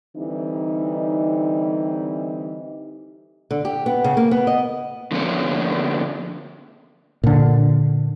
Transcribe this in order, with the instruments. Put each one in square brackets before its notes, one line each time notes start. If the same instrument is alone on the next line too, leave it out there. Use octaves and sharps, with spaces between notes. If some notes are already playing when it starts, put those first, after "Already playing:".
[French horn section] D3 E3 G3 C4 D#4
[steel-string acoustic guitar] D3
G4
B3
C#3
A#3
B3
D#5
[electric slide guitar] D3 F3 A#3 B3 C#4 D4
[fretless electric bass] A#2 D3